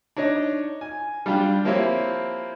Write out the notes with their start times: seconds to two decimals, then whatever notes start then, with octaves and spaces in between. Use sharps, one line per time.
0.17 D4 D#4 C#5 D#5
0.81 G#5
1.26 G3 D4 F4 G4 G5
1.65 F3 A#3 C4 E4 G4 C#5